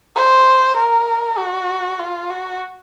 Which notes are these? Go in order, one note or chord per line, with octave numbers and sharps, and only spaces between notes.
C5
A#4
F#4
F4
F#4